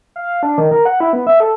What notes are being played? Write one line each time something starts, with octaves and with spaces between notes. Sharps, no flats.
F5
D4
D#3
A#4
F#5
E4
B3
E5
A4